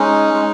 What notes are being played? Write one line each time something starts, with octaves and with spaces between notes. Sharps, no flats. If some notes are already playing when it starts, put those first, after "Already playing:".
Already playing: G#3 C#4 D#4
G#3